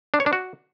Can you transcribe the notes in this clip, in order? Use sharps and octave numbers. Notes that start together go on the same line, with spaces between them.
D4
C#5
D4
F#4